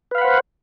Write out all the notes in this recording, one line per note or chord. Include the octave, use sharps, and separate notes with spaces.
B4 C5 F5 F#5 B5